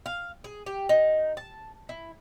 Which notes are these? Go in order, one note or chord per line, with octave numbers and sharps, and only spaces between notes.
F5
G#4
G4
D#4
A5
E4